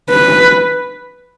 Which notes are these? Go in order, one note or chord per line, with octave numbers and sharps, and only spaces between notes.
B4